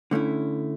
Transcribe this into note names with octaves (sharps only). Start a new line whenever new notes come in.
D3 A3 C#4 E4